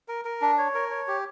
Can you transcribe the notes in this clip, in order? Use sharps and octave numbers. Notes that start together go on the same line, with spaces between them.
A#4
A#4
D4
C#5
A#4
C#5
G4